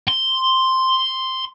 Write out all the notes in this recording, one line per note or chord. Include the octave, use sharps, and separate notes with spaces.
C6